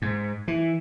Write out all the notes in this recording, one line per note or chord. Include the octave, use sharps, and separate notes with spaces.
G#2
E3